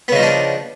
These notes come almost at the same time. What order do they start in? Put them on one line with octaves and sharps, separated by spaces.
B3 C#3 D#4 F3 D4